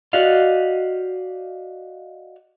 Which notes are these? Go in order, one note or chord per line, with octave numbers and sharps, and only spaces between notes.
F#4 G4 D5 D#5 F5